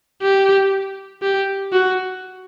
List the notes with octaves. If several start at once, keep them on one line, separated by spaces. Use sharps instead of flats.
G4
G4
F#4